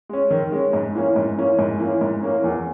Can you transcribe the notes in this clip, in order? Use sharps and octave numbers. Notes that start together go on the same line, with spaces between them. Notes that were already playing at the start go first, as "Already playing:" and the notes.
G#3 C#4
D#3
G#3 C#4
G#2
E3 A#3 C#4
G#2
E3 A#3 C#4
G#2
E3 A#3 C#4
G#2
E3 A#3 C#4
E2